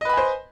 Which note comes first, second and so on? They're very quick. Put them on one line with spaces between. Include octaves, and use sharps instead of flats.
D#5 B4 B5 G#5 C5